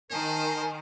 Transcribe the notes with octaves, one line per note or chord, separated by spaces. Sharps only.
D#3 A#4 C5 G#5 A5